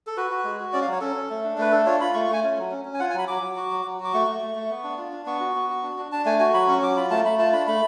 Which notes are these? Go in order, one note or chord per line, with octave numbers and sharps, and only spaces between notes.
A4
F#4 B4
F#4
G#3
F#4
C#4 D5
F5
F#3
C#5
C#4 A4
C#4
A3
D4
A3 B4
D4 A4
F4 C#5
F4 B5
A3 C#6
C#6
A3 G#5
C#4
F#3
C#4
C#4
G#5
F4 F#5
G#5
F#3 B5
F#3 D6
F#3
F#4
F#3
F#3
F#4 D6
A3 C#6
A3
A3
A3
B3
D4
F4
D4
B3 C#6
F#4
B3
F#4
D4
D4
D4 A5
A3 G#5
F#4 G#5
F#3 B5
C#4 C#6
F#3 D6
F4 B5
A3 A5
A3 B5
F4 A5
D4 B5
A3 B5